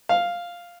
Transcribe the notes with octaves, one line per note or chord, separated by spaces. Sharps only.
F5